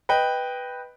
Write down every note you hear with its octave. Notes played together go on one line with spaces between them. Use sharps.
B4 D#5 G5